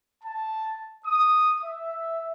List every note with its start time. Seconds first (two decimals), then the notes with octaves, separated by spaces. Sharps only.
0.24 A5
1.07 D#6
1.65 E5